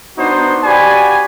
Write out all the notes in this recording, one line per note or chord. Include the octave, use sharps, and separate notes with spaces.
B3 D4 D#4 F#4 C5
F#4 G4 D5 G#5 B5